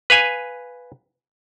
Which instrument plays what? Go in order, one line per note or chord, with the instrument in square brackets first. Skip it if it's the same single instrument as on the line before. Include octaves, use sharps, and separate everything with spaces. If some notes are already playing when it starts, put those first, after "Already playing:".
[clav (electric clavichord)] B4 F5 G#5